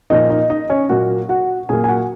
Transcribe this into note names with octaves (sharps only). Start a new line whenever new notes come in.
A#2 F3 A#3 D#4 D#5
D#4 D#5
D#4 D#5
C#4 C#5
A#2 F#3 A#3 F#4 F#5
F#4 F#5
A#2 F#3 A#3 G#4 G#5
G#5
F#4 F#5